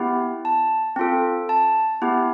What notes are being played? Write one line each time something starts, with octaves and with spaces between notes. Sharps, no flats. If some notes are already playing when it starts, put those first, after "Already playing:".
Already playing: B3 E4 G4
A5
C4 F4 A4
A5
B3 E4 G4